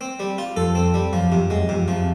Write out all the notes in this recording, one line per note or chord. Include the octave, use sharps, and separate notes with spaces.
C4
G3
F4
F2 A4
C4
G3
F#2 F3
F2 C3
F#2 G#3
F2 C3
F2 F3